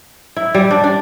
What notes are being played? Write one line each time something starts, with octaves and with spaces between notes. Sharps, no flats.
E4
G3
D4
D4